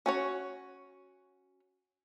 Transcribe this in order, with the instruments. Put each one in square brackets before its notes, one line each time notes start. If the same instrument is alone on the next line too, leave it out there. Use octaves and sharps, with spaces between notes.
[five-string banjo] C#4 F#4 C#5